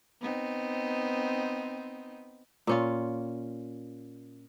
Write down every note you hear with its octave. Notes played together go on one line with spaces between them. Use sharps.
B3 C4 D#4
A#2 C#4 F4